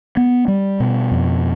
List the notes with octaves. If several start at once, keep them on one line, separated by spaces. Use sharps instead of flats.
B3
G3
B2
F2